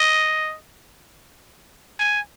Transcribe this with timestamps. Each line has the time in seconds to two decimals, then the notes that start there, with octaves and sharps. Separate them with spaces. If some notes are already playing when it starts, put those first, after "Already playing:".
Already playing: D#5
1.99 G#5